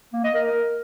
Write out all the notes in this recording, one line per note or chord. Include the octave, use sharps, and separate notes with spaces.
A#3
D#5
A#4